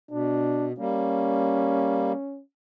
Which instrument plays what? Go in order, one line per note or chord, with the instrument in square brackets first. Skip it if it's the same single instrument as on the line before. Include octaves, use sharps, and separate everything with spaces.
[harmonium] B2 [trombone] D4
[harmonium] G3 A#3 [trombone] C#4